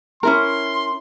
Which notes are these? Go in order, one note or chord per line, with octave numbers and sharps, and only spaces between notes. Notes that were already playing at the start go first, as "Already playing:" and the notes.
C#4 E4 A#4 C6